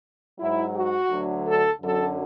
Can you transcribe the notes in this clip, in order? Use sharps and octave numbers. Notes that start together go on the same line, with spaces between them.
G#2 F#3 E4
F#4
D2 D3 F#3
A4
F#2 D3 F#3 A4